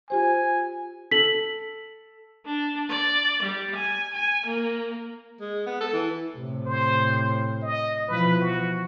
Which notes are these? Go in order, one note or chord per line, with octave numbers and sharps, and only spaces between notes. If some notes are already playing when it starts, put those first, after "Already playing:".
F4 G4 C5 G#5
A4 B6 F#7
D4
D5
G3
G#5
G#5
A#3
G#3
B3
A4
E3
A2 C3
C5
D#5
B2 E3 F3 B4
F#4